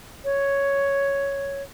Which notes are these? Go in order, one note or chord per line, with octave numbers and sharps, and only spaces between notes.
C#5